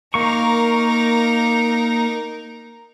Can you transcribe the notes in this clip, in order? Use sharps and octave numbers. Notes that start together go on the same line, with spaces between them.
A#3 D#4 A#4 C#6